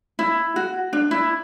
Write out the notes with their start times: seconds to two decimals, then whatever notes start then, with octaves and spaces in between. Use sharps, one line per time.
0.19 E4
0.56 F#4
0.93 D4
1.11 E4